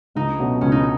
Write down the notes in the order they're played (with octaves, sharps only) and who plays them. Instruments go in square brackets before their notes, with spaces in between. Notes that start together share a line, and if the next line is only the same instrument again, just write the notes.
[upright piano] C#2 [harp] D#4
[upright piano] B2 F#3 A3 C#4
[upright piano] C#2 [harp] C#4
[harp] D#4